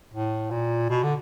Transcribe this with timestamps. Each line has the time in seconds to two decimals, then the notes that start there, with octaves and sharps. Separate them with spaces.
0.14 A2
0.51 A#2
0.90 B2
1.03 D3